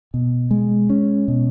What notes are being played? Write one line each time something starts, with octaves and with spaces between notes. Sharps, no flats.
B2
G#3
C#4
B2